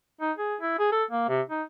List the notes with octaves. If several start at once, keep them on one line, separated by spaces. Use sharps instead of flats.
D#4
G#4
E4
G#4
A4
A#3
C3
D#4